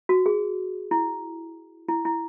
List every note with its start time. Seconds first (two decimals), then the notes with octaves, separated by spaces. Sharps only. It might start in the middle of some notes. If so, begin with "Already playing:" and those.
0.09 F#4
0.26 G#4
0.91 E4
1.89 E4
2.05 E4